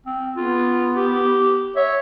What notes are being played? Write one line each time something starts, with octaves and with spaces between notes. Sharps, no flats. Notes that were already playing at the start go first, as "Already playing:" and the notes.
C4
B3 F4
G4
C#5 E5